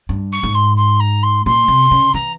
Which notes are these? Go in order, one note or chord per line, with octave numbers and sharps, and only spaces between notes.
G2
C#6
G#2
C6
C6
A#5
C6
A#2 C6
C3
C#3
E3 A#5